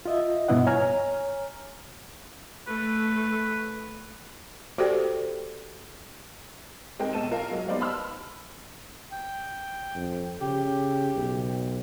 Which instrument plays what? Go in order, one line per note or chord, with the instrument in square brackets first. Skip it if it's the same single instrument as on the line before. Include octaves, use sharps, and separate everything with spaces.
[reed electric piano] F4 D#5 E5
G2 B2 B3 E4 D#5 F#5
C#5 G#5 A#5 F6
[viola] A3 [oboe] B4
[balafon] F#4 G4 A4 C5 D5 G5
[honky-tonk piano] G#3 C4 D#4 G4 A#4 G5
B1 A4 A5 D#7 E7
F4 A#4 F5
F#3 G#3 A#3
G3 B3 D#4 C5 D5 F5
A5 B5 C6 E6 F6
[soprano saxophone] G5
[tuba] F2
[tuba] C#3 [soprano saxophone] G4
[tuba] B1